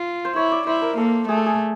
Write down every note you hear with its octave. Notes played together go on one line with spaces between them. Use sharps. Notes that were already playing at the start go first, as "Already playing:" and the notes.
Already playing: F4
C5
E4 C#5
D5
E4 C5
A#4
A#3 A4
A3 G#4
A4
G#4